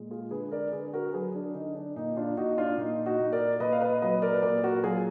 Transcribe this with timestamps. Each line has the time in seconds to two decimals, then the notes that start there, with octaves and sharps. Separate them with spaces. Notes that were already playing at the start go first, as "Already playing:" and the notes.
Already playing: A#2 G#3
0.11 F4 G#4
0.31 D3 G#4 B4
0.51 A#4 D5
0.72 D3 G#4 B4
0.93 F#4 A#4
1.13 F#3 G#4 B4
1.35 D4
1.54 D3 D#4
1.75 D4
1.96 A#2 D#4
2.17 D4 F4
2.37 A#2 D#4 F#4
2.52 D#4
2.58 D4 F4
2.78 A#2 D#4
3.06 D#4 F#4
3.20 A#2
3.32 A#4 D5
3.60 A#2 B4 D#5
3.72 F5
3.81 B4 D#5
4.02 F#3 B4 D#5
4.22 A#4 D5
4.34 B4
4.42 A#2 A#4 D5
4.63 F#4 A#4
4.83 F#3 F4 G#4